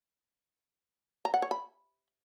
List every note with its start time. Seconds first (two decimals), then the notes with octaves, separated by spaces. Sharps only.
1.25 A#5
1.34 F#5
1.42 C#5
1.51 B5